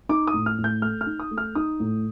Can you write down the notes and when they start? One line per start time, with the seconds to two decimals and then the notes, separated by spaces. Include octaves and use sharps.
0.09 D#4 D6
0.27 D#6
0.34 A2
0.46 F6
0.58 A2
0.64 G6
0.82 A3 F6
1.01 F6
1.06 D#4
1.20 D#6
1.31 A3
1.38 F6
1.55 D#4 D#6
1.80 A2